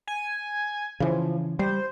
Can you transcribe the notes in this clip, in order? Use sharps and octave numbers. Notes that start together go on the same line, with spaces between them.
G#5
C#3 E3 F3
G3 C5